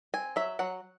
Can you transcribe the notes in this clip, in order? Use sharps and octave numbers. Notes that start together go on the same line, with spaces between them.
C4 G#5
F#3 E5
F#3 F#5